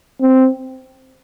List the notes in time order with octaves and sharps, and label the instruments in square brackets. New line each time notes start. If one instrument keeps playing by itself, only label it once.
[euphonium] C4